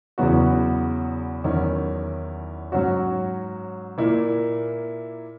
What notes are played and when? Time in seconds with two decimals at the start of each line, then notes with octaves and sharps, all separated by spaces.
0.18 E2 C#3 F#3 B3 F#4
1.44 E2 D#3 F#3 C#4 E4
2.72 G#2 F#3 C#4 F#4
3.98 A#2 A#3 E4